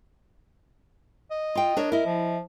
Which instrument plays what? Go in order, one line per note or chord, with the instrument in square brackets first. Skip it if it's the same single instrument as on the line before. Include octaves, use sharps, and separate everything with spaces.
[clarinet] D#5
[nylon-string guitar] F4 G5
D4 A#4 C#5
[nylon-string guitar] E4 D#5 [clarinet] A#4
[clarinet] F3